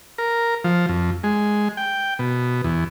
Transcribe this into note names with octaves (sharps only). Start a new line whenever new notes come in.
A#4
F3
F2
G#3
G5
B2
E2